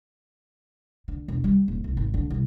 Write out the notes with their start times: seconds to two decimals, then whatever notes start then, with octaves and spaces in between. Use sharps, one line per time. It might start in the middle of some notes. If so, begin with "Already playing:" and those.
1.08 D3
1.28 E1
1.44 G3
1.68 D#1
1.84 C2
1.97 G#1
2.14 D3
2.30 C2